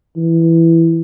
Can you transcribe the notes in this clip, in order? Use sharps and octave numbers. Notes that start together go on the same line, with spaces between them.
E3